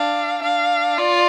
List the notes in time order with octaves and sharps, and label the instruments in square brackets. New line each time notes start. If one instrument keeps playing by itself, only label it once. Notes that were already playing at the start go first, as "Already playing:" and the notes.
Already playing: [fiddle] D4 [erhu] F5
[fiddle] D4 [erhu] F5
[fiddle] F4 [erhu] D5